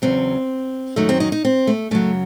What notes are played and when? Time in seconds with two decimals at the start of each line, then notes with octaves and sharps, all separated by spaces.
0.02 E2 C#3 F#3 C4
0.96 F#2 D#3 F#3 A3
1.09 C4
1.20 D#4
1.32 D#4
1.45 C4
1.67 A3
1.91 F#2 C#3 F#3 A3